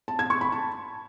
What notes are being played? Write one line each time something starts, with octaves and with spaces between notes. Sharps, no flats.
A5
G#6
C#6
B5
A5